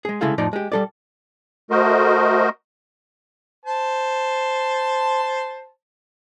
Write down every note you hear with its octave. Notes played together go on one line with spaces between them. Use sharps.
G#3 G#4
C2 C#3 G#3 E4 A4 F5
F2 A2 F3 D#4 D5
G#3 G4
G3 A4 D5
A3 F#4 A#4 C5 D#5
C5 A5